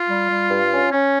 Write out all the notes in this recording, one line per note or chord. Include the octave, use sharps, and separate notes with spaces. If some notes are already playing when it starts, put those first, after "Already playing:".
Already playing: F4
G3
G3
G2
C#4
C#4